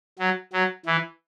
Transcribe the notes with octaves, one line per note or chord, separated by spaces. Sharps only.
F#3
F#3
E3